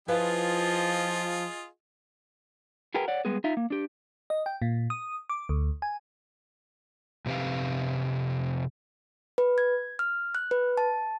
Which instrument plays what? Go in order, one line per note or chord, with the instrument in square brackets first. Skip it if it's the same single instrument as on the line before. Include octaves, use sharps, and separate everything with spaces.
[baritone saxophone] F3 [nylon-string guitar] E4 B4 F5 [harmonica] F4 G#4 D#5
[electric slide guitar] F#4 G#4 A#4 B4 G5
C#5 D5 F#5
G3 G#3 B3 G#4
D#4 F4 E5
A#3
D4 G4
[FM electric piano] D#5
G5
A#2
D#6
D6
D2
G#5
[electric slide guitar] F2 C3 C4 G4 B4 F5
[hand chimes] B4
G#6
F6
F#6
B4
A5